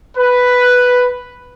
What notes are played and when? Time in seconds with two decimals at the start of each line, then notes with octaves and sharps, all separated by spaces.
0.18 B4